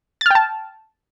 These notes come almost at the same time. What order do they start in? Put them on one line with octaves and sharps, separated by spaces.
A6 F6 G5 A5